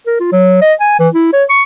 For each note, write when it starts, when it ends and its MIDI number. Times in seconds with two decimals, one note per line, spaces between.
0.07 0.16 70
0.20 0.29 65
0.32 0.61 54
0.62 0.73 75
0.80 0.97 80
0.99 1.09 52
1.14 1.31 64
1.33 1.44 73
1.50 1.63 85